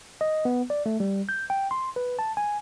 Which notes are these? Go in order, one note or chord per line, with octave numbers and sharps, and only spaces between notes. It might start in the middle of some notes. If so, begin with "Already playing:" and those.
D#5
B3
D5
A3
G3
G6
G5
C6
B4
A5
G#5